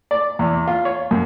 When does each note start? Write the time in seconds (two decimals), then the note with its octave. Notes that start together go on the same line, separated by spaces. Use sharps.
0.11 D5
0.39 E2
0.67 F4
0.85 C#5
1.11 F#2